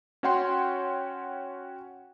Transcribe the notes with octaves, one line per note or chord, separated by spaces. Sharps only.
C#4 F#4 C#5 F#5 G5 C6